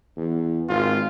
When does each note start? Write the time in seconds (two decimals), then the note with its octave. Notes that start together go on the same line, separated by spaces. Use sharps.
0.17 E2
0.69 G#1 F4